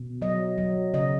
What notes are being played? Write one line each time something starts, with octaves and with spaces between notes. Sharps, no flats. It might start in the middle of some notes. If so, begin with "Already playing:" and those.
Already playing: B2
F#3 D#5
F#3
C#3 D#5